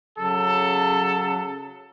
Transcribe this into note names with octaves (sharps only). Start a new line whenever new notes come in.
C#3 F#3 A4